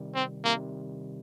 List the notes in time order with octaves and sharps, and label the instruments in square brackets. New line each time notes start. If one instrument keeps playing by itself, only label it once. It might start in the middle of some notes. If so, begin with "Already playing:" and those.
Already playing: [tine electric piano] C3 D#3 G3
[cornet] C4
[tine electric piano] C3 D#3 G3 [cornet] A#3